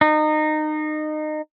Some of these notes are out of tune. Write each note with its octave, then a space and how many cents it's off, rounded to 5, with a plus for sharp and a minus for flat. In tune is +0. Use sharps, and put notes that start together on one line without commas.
D#4 -25